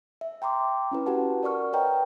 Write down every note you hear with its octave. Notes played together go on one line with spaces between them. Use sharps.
E5
G5 A#5 C6 D6
C#4 E4 B4
F#4 G4 B4 F#5 A5
A#4 D5 F#5 C#6 F6
B4 C#5 D#5 G5 A#5